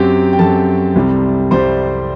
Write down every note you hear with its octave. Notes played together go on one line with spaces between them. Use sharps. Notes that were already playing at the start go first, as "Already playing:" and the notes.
Already playing: F#2 F#3 C4 G4 G5
G5
F#2 F#3 C4 A4 A5
C2 C3 G3 C4
C2 C3 G3 C4 C5 C6